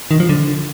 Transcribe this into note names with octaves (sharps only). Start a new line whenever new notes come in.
D#3
F3
D3